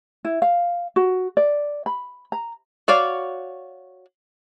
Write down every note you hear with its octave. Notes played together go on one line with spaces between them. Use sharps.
E4
F5
F#4
D5
B5
A#5
F#4 C#5 D5 F5